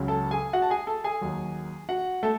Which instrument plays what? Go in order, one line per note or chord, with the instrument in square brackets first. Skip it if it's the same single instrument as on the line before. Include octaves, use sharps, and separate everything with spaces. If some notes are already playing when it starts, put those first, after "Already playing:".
Already playing: [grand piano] C#2 C#3 F#3
A4 A5
G#4 G#5
F#4 F#5
A5
G#4 G#5
A4 A5
G#4 G#5
D#2 D#3 F#3
F#4 F#5
A3 A4